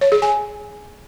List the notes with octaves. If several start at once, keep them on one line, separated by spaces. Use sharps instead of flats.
C#5
G#4
G#5